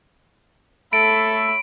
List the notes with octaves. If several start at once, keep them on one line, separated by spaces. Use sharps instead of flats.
A3 A4 C#5 E5 B5 D7